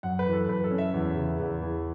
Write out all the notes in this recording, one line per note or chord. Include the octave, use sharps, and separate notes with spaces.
F#2 F#5
B4
E3
A4
F#2 B4
A4
C#4
E5
E2
C#3
E2
E3